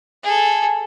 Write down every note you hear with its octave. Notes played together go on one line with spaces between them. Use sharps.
G#4 A4